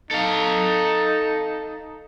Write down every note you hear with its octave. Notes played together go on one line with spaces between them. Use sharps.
D#4 A4 F5